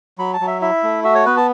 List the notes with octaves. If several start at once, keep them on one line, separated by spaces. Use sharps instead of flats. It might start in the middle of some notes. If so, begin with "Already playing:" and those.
F#3 B5
A5
F#3
E5
E4 E5
A3
F#4 E5
C#5
B3 B4
A5